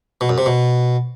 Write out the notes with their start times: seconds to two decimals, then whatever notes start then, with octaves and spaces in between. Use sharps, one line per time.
0.21 B2
0.29 F#2
0.38 C3
0.46 B2